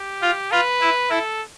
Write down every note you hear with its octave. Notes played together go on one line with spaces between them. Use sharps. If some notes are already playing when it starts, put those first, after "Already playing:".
Already playing: G4
F4
F4 B4
E4
E4 A4